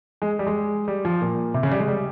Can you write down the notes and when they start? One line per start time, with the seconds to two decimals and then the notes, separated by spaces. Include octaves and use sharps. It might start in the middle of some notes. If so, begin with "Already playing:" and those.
0.22 G#3
0.39 G3
0.47 G#3
0.88 G3
1.05 F3
1.21 A#2
1.54 C3
1.63 C#3
1.71 G3
1.80 G#3
1.88 G3